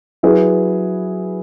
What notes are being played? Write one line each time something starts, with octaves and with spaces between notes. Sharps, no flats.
F#3 E4 G#4 B4